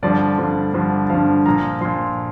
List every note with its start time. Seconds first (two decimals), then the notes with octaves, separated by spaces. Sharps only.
0.03 G2 D3 F3 D5
0.38 G2 D3 F3
0.74 G2 D3 F3
1.10 G2 D3 F3 F5
1.46 A#2 F3 A#5
1.81 A#2 F3 C6